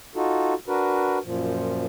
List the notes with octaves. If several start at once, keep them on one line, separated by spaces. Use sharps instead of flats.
D#4 F4 F#4 A4
D4 F#4 A#4 B4
F#2 A#2 F3